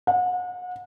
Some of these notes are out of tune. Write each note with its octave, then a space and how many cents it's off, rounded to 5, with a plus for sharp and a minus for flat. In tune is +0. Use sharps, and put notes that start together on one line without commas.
F#5 -35